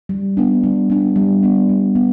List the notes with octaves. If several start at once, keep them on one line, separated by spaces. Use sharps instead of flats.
G3
B3 D4
G3
B3 D4
G3
B3 D4
G3
B3